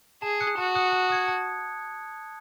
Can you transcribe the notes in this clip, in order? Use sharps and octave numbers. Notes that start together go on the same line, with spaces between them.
G#4 A5
D#6 F#6 C#7
F#4 A5
D#6 F#6 C#7
A5
D#6 G#6 C#7
A5